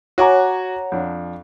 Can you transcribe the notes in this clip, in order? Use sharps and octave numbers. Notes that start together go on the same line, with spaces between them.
F#4 C#5 F#5 G#5 A#5 D6
F2 D4